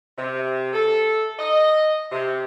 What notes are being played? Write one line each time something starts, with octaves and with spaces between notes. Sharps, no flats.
C3
A4
D#5
C3